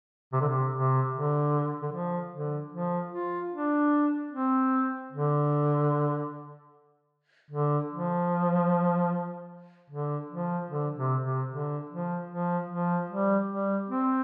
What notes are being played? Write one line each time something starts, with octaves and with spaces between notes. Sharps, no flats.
C3
D3
C3
C3
D3
D3
F3
D3
F3
F4
D4
C4
D3
D3
F3
D3
F3
D3
C3
C3
D3
F3
F3
F3
G3
G3
C4